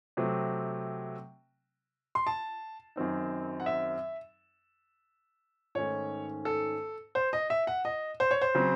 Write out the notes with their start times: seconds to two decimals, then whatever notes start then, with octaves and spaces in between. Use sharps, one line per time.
0.17 C3 F#3 A3 C4
2.15 C6
2.27 A5
2.96 F#2 D#3 F#3 C4 D#4
3.60 F#5
3.66 E5
5.75 G#2 D#3 A3 C#4 C#5
6.45 A4
7.15 C5
7.33 D#5
7.50 E5
7.67 F#5
7.85 D#5
8.20 C5
8.31 C#5
8.41 C5
8.55 C#3 F#3 C4